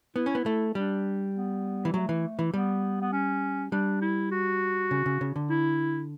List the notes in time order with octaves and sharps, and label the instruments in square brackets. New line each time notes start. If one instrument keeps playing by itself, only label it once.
[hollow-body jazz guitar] B3 [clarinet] E4
[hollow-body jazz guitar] C#4
B3
A3
[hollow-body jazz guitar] G3 [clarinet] D4
[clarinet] B3
[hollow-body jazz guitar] E3
[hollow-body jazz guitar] F#3 [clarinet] A3
[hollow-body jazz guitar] E3
E3
[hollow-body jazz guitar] G3 [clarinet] B3
[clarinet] B3
C#4
[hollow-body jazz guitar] G3 [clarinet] D4
[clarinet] E4
F#4
[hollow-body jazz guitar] C#3
C#3
C#3
D3
[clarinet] E4